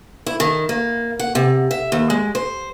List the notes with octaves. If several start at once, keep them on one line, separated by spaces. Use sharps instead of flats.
E4
D#3
A#3
F#5
C3
E5
D#2
G#3
C5